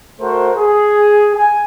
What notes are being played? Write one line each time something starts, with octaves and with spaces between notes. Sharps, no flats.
A3 F#4 A#4 C5
G#4
G#5